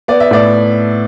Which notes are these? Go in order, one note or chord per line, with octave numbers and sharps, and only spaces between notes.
B3 D5
E5
A2 D5